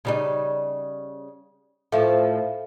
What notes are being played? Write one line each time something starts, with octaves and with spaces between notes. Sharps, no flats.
C#3 G3 D#4
A2 F3 A4 E5 F5